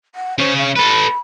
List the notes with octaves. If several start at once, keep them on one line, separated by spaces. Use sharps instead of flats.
F#5
C#3 C#4 C5
F5
A4 B4 B5